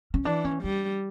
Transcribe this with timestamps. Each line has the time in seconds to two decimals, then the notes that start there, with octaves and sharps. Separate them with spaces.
0.14 C#4
0.25 E3 D4
0.45 C#4
0.63 G3 D4